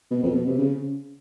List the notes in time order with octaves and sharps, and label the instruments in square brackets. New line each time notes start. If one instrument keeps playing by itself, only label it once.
[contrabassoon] B2
F2
B2
C3
C#3